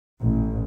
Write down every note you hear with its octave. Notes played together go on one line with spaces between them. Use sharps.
A1